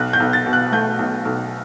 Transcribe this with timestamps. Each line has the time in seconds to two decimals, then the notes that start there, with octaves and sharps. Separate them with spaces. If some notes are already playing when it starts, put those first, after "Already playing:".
Already playing: B1 F#6
0.13 G6
0.20 B1
0.33 A6
0.46 B2
0.53 F#6
0.72 A3 G6
0.99 B1
1.25 B1